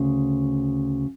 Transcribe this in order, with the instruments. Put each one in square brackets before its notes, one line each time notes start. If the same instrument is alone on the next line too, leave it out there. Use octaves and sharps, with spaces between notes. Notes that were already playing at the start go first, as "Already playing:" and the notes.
Already playing: [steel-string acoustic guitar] D2 C#3